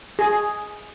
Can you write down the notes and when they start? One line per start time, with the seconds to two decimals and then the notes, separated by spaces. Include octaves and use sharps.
0.19 G#4